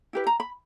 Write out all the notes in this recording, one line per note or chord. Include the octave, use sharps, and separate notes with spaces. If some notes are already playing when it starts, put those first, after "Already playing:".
E4 G4 B4
A#5
B5